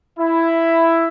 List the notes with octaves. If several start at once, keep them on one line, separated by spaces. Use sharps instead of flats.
E4